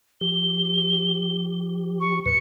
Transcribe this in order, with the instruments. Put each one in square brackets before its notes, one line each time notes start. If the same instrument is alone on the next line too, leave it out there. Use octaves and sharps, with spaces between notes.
[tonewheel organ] F3 G4 [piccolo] G7
[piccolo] C#6
[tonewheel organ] E2 A#2 B4 [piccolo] C#7